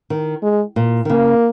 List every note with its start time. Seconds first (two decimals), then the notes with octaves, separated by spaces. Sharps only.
0.10 D#3
0.43 G#3
0.76 A#2
1.05 D#3
1.10 C#3 A#3